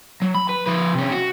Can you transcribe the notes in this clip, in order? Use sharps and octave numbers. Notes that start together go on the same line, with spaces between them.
F#3
B5
B4
F3 B4
C3 C#4
F#4